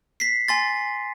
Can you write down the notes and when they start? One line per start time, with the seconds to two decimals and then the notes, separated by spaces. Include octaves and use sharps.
0.20 B6 C7
0.48 G#5 C6 A6